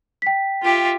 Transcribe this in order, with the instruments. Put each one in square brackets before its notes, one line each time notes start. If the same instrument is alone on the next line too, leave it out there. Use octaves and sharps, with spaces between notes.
[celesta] G5 B6
[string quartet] F4 G4 E5